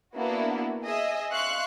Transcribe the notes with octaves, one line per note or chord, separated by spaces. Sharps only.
A#3 B3 D4 E4 F#4
G#4 D#5 E5
E5 F5 C6 C#6 F#6